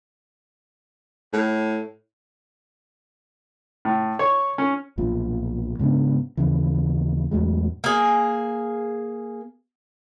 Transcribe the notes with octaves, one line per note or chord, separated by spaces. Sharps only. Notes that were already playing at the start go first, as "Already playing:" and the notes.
A2
A2
C#5
C#4
B1 A#2 F3
G#2 C#3 B3 D4
D#2 C#3 E3
E2 A2 F#3 G#3
A#3 G#4